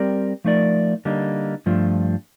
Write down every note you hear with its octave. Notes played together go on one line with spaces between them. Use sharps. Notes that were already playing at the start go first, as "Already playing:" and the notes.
Already playing: G3 C4 G4 A#4 D5
F3 A3 D#4 A#4 D5
D3 G3 A#3 D#4
G2 F3 A3 D4 F4